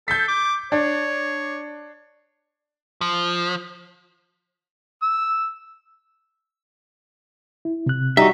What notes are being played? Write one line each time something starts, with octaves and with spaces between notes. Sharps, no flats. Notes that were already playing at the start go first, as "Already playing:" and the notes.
A4 G6 B6
D6
D4 C#5
F3
E6
E4
C3 F#6
G3 D#4 F#4 G4 E5